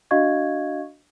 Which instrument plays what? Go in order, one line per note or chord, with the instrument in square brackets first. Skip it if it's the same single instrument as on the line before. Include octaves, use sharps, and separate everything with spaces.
[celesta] D4 F#4 D#5 F5 C#6 G#6